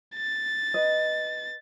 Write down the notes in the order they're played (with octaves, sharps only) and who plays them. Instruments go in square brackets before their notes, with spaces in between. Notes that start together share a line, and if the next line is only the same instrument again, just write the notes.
[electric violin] A6
[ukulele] B4 D#5